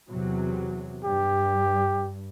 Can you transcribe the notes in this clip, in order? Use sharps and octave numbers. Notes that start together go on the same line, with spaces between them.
E2 C3 F#3
G2 G4